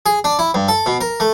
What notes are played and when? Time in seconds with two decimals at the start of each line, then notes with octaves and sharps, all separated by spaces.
0.06 G#4
0.24 D4
0.39 E4
0.54 G2
0.68 A4
0.86 B2
1.01 A#4
1.20 A3